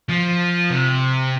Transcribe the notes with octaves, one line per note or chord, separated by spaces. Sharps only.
F3
C3